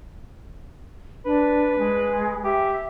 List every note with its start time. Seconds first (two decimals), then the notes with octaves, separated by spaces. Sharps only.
1.26 D4 B4
1.78 G#3
2.44 G4 E5